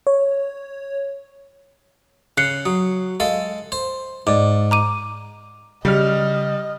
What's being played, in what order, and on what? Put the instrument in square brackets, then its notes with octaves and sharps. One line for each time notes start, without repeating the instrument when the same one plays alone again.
[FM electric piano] C#5
[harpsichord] C#3 [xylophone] F#6 C7 C#7
[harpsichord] F#3 [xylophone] D#6
[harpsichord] G#3 A4 [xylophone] F5
[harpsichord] C5
[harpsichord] G#2 [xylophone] D5 D6
[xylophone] A#5 D6 D#7
[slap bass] C#3 [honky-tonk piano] G3 F6 [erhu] D#5